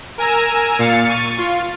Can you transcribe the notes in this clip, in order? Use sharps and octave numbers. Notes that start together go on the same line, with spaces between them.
A#4 G#5 A#5 E6
A#2 F5 F6 A6 C#7
C#6 A6 D#7
F4